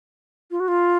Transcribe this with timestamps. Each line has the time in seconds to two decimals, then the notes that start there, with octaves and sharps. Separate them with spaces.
0.51 F4
0.60 F#4
0.68 F4